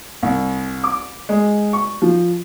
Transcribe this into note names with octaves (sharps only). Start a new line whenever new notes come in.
C2
D6
G#3
C#6
F3